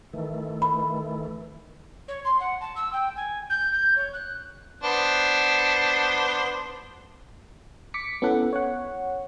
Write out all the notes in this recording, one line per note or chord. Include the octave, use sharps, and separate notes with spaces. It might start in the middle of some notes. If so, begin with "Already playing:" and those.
D#3 E3 A3
B5
C#5
C6
F#5
A5
E6
G5
G#5
G6
G6
C#5
F#6
B3 D4 C5
D6 B6 C#7
B3 C#4 E4 A4 F#5
C#5 F#5